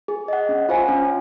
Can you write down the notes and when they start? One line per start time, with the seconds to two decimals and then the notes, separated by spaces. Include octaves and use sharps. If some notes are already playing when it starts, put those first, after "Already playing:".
0.08 G#4
0.28 D#5 F#5
0.49 C#4
0.69 F4 C5 F5 G#5
0.89 C#4